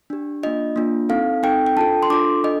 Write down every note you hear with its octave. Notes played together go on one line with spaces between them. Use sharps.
D4 G4
A#3 D4 F4 D#5
A#3 D4 F4
C4 D#4 A4 F5
C4 D#4 A4 G5
G5
D4 F4 A4 A5
C6
D4 F4 A4 D6
D4 A4 D#5